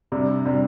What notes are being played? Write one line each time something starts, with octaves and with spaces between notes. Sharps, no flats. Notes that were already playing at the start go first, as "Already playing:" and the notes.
C3 G3 D4
C3 G3 D4